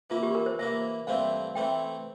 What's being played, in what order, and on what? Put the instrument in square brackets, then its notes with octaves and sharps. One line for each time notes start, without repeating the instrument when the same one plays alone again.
[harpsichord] E3 A#3 E4 [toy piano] F4
[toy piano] G4
A#4
C5
[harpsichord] E3 A#3 E4 [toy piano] E5
[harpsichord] G2 E3 A3 C4 E4 [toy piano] F5
[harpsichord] E3 A3 C4 E4 [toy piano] G5